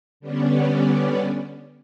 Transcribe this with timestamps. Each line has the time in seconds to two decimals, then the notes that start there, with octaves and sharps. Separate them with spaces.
0.20 D3 G3 B3 C#4 D4